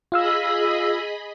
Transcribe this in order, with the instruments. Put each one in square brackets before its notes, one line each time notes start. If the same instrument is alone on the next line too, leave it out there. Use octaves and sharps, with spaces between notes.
[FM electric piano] F4 F5 E6 [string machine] G#4 D#5 B5